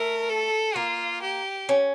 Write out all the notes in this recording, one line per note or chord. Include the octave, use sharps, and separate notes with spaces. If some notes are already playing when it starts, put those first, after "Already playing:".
Already playing: A3 A#4
A4
A#3 F4
G4
C#4